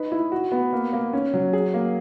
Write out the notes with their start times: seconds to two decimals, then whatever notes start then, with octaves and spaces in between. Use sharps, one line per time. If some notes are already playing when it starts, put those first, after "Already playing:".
Already playing: D#4 B4
0.12 E4
0.32 F#4
0.52 B3
0.73 A#3
0.93 A#3
1.13 C#4
1.34 F#3
1.53 G#4
1.74 A#3